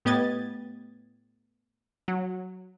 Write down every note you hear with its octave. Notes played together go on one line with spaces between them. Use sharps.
A2 B3 G4 D#5 G#6 A6
F#3